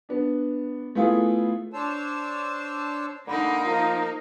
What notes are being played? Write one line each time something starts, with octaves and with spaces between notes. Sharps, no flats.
B3 D4
A3 B3 E4 F4 G#4
D4 C5 C#5 A5 E6
D3 A#3 D#4 B5
F3 A#4